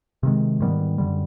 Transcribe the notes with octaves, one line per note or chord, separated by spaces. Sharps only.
C3 D#3 G#3
G#2 D#3 G3 B3
F#2 D3 G3